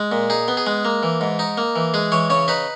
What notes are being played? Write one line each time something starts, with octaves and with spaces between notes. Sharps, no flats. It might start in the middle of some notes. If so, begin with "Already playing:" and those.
Already playing: G#3
A#2
D#4 G#4
B3
G#4
G#3
A#3
E3
G#2
D#4
A#3
E3
G#3 G#4
E3 C#5
C#3 C#5
D#4 B4